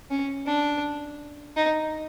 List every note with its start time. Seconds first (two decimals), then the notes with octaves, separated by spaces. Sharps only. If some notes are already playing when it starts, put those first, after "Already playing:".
0.11 C#4
0.46 D4
1.56 D#4